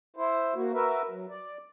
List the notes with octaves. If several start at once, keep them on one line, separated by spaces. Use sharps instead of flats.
E4 C5
A#3 F#4
F#4 A#4 B4 E5
F#3
D5